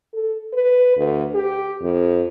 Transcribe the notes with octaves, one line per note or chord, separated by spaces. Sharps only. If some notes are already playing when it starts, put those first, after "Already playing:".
A4
B4
D2
G4
F2